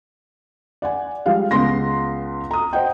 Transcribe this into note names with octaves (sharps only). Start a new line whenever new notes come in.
D5 F#5 G#5
F3 G3 G#3 F5
C#2 G#3 B3 C6 A#6
A#5 D#6
C5 D#5 F#5 G5